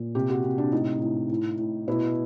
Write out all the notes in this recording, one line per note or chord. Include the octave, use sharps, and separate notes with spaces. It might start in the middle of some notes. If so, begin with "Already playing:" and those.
Already playing: A#2
C3 G4
F#4
C3
D4
A2 D#4
A2
A2
A2
B2 E4